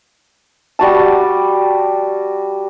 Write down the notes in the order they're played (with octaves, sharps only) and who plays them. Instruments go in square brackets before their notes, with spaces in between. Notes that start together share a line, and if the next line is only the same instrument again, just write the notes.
[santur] G3 F#4 A5